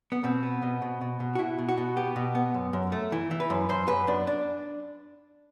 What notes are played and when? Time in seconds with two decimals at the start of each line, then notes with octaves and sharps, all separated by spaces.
0.12 B3
0.24 B2 C4
0.43 B3
0.63 B2
0.82 B2
1.01 B2
1.20 B2
1.35 F#4
1.38 B2 E4
1.59 B2
1.69 F#4
1.77 B2
1.96 B3 G4
2.16 B2
2.35 B3
2.54 F#2
2.73 F#2
2.92 A3
3.12 E3
3.31 E3
3.40 B4
3.50 F#2
3.69 F#2 C5
3.88 F#2 B4
4.07 F#2 D4
4.27 D4